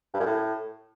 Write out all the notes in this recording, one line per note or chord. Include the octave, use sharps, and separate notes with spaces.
G2
F#2
A2